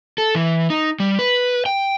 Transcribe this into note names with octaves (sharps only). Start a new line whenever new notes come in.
A4
E3
D#4
G3
B4
G5